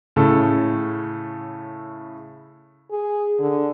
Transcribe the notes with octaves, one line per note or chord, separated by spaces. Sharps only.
A2 C#3 A4
G#4
D3